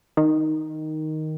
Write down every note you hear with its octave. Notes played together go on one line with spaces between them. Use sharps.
D#3